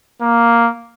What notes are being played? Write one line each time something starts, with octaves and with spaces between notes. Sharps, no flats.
A#3